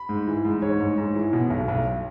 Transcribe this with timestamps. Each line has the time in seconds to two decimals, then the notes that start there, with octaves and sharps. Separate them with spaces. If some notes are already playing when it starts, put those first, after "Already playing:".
Already playing: B5
0.09 G#2
0.27 E3
0.45 G#2
0.62 G#2 C#5
0.80 G#2
0.98 G#2
1.15 E3
1.33 B2
1.50 B1
1.68 B1